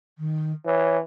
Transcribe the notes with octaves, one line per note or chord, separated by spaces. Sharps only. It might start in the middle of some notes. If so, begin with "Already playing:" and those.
D#3
E3 C#5